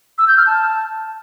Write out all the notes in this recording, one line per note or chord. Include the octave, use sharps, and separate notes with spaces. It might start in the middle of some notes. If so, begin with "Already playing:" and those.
E6
G6
F6
A5